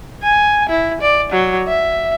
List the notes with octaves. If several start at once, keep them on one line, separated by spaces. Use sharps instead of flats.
G#5
E4
D5
F#3
E5